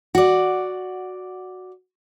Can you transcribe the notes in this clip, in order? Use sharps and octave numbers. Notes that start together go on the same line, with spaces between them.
F#4 D5